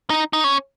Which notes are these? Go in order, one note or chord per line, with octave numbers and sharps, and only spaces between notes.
D#4
D#4
C#4